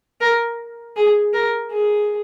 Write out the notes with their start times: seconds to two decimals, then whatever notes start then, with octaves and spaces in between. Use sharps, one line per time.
0.21 A#4
0.96 G#4
1.33 A#4
1.71 G#4